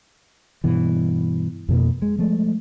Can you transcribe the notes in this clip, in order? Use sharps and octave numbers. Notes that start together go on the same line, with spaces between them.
G2 B2 E3
F2 B2 A#3
G#3
F3 G#3 A3